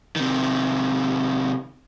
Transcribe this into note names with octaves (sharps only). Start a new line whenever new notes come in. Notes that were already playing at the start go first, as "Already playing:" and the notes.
C3 D#3